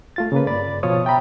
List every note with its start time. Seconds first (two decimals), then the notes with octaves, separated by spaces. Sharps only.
0.16 A3 F4 A6
0.32 C#3 A#3 B4
0.47 G2 D5 B5 A6
0.83 B2 F3 F4 C#5 D#6
1.05 E5 G5 A#5 B5